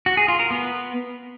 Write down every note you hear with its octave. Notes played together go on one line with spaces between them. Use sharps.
F#4
G#4
F4
A#4
B3